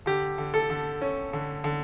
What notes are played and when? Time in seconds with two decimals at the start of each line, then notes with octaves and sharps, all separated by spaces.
0.06 D3 G4
0.38 D3
0.54 A4
0.70 D3
1.02 C#4
1.33 D3
1.64 D3